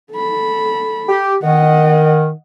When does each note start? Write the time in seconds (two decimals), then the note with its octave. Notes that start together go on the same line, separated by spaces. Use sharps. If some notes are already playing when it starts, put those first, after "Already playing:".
0.12 A4 B5
1.09 G4
1.43 D#3 D#5 F#5